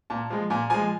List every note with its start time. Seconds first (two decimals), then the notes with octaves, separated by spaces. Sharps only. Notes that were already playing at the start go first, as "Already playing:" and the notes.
0.10 A#2 A5
0.30 F3 G#3
0.50 A#2 G#5
0.70 F3 G#3 G#5